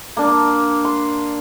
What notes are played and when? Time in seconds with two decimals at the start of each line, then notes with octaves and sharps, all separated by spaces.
0.17 A#3 D4
0.85 C6